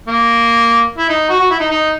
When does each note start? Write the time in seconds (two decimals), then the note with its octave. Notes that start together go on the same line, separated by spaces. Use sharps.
0.08 A#3
0.98 E4
1.09 D#4
1.29 F#4
1.39 F#4
1.50 E4
1.60 D#4
1.71 D#4